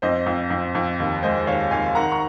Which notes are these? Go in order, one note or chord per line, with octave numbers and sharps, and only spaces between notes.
F2 C5 D#5
F2
F2
F2
D#2
G#3 C5 D#5
D#2 C#5 F5
D#2 F5 G#5
D#3 F#5 A#5
A#5 C#6